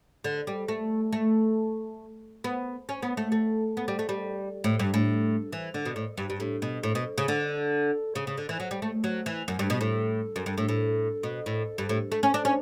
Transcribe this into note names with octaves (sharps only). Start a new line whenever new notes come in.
D3
G3
A3
A3
B3
C#4
B3
A3
A3
B3
G3
A3
G3
A2
G2
A2
E3
D3
B2
A2
G2
G2
A2
B2
A2
B2
C#3
D3
C#3
C#3
D3
E3
F#3
G3
A3
F#3
E3
F#2
G2
B2
A2
F#2
G2
A2
A2
B2
A2
G2
A2
A3
C#4
D4
C#4